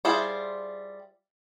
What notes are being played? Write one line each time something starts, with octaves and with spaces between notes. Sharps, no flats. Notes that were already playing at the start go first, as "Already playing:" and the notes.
G3 E4 F4 G#4 C5